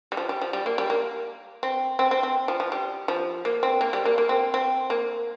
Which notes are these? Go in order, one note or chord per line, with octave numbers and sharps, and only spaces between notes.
G3
F3
G3
F3
G3
A#3
G3
A#3
C4
C4
C4
C4
F3
F3
G3
F3
A#3
C4
A#3
G3
A#3
A#3
C4
C4
A#3